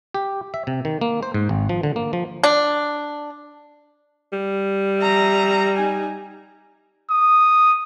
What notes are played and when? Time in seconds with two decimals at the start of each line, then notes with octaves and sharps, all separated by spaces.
0.14 G4
0.54 E5
0.67 C3
0.85 D#3
1.01 A#3
1.23 C5
1.34 G#2
1.49 G#1
1.69 F3
1.83 D3
1.96 A#3
2.13 F3
2.43 D4
4.33 G3
5.00 E5 A#5
5.77 D#4 G#5
7.10 D#6